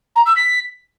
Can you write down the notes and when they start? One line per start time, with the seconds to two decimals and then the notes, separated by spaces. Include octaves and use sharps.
0.16 A#5
0.26 E6
0.36 B6